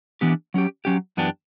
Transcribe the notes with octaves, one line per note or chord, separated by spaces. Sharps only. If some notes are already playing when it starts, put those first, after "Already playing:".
E3 B3 D4 G4
F#3 C#4 G4
F#3 C#4 G4
F#2 E3 B3 D4 G4